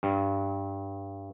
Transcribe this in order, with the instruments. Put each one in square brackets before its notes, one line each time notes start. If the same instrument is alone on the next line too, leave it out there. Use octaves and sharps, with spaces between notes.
[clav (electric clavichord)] G2